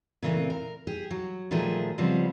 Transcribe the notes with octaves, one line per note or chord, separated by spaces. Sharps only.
A#2 C#3 E3 A3 C4
A#4
G4 G#4
F#3
A#2 D#3 F3 F#3 A3 G#4
C#3 F3 G3 G#3 B3 C4